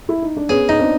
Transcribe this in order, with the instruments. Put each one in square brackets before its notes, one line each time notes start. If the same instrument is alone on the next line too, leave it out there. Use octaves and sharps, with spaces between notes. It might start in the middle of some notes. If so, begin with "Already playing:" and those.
[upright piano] E4
D#4
D4
[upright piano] B3 C#4 [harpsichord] G#4
[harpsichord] D#4
[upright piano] C4 D4